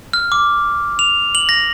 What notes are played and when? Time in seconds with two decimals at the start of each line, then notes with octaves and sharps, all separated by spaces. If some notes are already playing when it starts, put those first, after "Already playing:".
0.13 F6
0.32 D6
0.99 F7
1.35 F#7
1.49 A#6